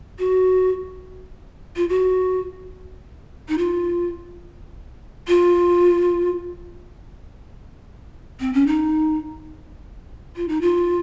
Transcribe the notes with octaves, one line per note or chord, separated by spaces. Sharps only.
F#4
F4
F#4
D#4
F4
F4
C4
C#4
D#4
F4
D#4
F4